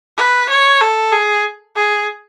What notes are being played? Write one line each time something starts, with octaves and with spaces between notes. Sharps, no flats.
B4
C#5
A4
G#4
G#4